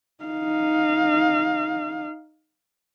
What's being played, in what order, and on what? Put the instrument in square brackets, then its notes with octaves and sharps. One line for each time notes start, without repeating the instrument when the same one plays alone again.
[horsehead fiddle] D#4 F5